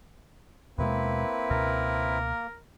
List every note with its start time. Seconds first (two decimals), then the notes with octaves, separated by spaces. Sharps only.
0.78 D#2 B2 G#3 A#3 C4 E4 B4
1.51 C#2 B2 A#4